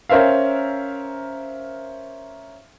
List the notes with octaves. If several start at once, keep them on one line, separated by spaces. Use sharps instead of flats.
C#4 A#4 C5 E5 F5